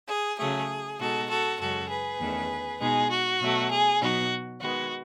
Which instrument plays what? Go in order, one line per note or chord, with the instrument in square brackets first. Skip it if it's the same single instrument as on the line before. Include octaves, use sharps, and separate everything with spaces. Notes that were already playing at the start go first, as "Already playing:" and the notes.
[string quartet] G#4
C#3 F#3 A3 G#4
B2 G#3 D#4 F#4 A4
F#4 A4
F#2 C#3 G#3 C#4 F#4 A4
G#4 B4
E2 D#3 A3 C#4
B2 G#3 D#4 G#4
F#4
B2 F#3 A3
G#4
B2 F#3 B3 D#4 F#4
D#3 G#3 B3 F#4